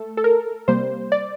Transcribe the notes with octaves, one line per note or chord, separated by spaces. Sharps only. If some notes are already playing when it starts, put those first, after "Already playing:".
Already playing: A3 A4
A4
A#4
C3 G3 A#3 C5
D5